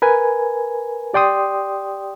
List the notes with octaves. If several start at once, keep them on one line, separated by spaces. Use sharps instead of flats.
A#4 B4 G#5
G4 D5 G5 C6 D#6